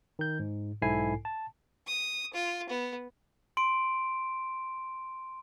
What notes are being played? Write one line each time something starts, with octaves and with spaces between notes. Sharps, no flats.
D#3 G6
G#2
B1 G#2 E4 A4 G#5 C7
A5
D#6
F4
B3
C6 D7